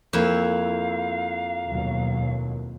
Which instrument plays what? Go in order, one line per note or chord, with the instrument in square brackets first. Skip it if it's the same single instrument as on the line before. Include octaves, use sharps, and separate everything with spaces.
[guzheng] F2 E4 [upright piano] A#3 [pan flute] F5
[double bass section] D#2 B2 F#3